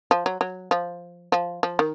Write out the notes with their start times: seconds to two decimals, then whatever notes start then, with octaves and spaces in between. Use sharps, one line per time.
0.11 F3
0.26 F#3
0.41 F#3
0.71 F3
1.32 F3
1.63 F3
1.79 D#3